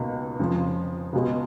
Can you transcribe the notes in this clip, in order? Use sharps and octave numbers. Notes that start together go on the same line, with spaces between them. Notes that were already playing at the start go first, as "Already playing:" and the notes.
Already playing: C#2 B2 A#3 D#4
F2 C#3 F3
C#2 B2 G#3